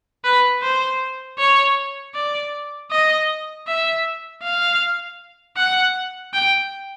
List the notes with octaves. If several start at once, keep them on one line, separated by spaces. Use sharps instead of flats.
B4
C5
C#5
D5
D#5
E5
F5
F#5
G5